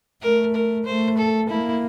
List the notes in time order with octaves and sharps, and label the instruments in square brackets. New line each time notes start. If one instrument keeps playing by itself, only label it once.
[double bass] A3 [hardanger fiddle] A#4
[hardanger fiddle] A#4
[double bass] A3 [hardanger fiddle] C5
[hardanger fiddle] A4
[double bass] A#3 [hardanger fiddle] E4